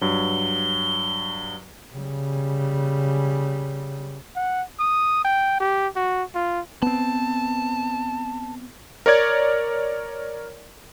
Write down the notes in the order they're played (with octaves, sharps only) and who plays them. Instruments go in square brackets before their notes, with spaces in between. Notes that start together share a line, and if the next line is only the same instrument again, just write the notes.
[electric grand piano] G2 F#3 [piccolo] G7
[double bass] C#3 G3
[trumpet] F#5
D#6
G5
G4
F#4
F4
[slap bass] B3 C4 [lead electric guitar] A5
[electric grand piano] A#4 C#5 D5 G#6